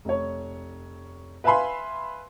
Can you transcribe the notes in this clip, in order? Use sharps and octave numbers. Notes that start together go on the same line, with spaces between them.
F1 C#5
B4 E5 F5 G#5 B5 C6